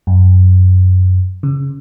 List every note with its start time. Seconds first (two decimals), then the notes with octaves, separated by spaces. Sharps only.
0.07 F#2
1.43 C#3